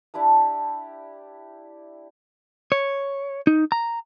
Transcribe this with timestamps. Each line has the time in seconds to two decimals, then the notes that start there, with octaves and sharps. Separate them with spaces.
0.14 D4 E4 G4 A5
2.72 C#5
3.47 D#4
3.72 A#5